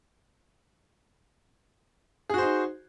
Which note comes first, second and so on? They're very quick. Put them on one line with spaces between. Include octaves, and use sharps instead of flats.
G#4 F#4 C5 D#4